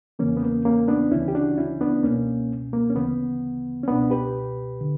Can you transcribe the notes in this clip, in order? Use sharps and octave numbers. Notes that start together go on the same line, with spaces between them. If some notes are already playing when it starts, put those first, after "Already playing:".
E2 C#3 E3 A#3 C#4
B3
A#3
A#3 C#4
B3 D4
D2 C#3 E3 C#4 E4
G4
D4 F#4
C#4 E4
B3 D4
C#2 B2 A#3 C#4
A#3
C#4
D2 C#3 E3 B3
C#4
C#2 B2 B3 D4
G4 B4
D3